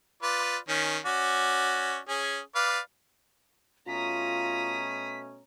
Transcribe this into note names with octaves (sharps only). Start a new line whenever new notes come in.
F4 B4 D5
D#3 C#4
C#4 F#4 D5
C#4 G#4
B4 D5 F5
B2 A3 C#4 F4 A#5 D#6 B6